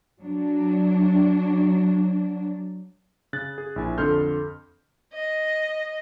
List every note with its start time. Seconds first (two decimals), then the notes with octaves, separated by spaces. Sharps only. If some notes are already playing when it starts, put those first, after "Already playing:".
0.21 F#3 D4
3.33 C#3 F#6 A6
3.58 G#4
3.76 A#1 E4 G#5
3.98 F2 D3 A4 C6 F6 G6
5.13 D#5